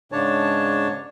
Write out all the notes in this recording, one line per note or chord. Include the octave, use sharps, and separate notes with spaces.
G#2 C#3 D4 C#5 A5